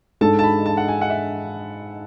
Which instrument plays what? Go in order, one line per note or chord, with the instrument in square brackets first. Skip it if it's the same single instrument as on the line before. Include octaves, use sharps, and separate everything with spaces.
[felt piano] G#2 G#3 D4 A4 [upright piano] A5
[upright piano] A5
B5
A5
F#5
G#5
F#5
E5